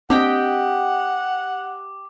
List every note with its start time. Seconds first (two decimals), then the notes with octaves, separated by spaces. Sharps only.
0.10 C4 D4 G4 D#5 F#5 G5 D6